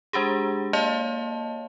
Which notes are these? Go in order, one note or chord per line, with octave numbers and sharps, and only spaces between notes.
G#3 D4 G4 G#4
A#3 C#5 D#5 F5 A5